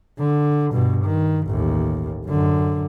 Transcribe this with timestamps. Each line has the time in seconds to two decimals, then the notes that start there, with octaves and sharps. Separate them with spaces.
0.19 D3
0.72 G2 B2
1.04 D#3
1.47 A1 D#2
2.26 F#2 D3